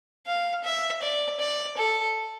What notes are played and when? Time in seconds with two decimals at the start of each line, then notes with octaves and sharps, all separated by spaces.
0.27 F5
0.64 E5
1.02 D5
1.40 D5
1.78 A4